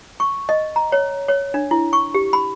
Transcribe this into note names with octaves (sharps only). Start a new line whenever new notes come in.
C#6
D#5
A#5
C#5
C#5
D4
E4
C#6
G4
B5